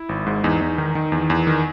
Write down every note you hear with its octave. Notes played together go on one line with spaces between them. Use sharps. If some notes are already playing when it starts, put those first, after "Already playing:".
Already playing: E4
G#1
G#2
E2 D#4
E2
D#3
D#3
E2
E2
D#3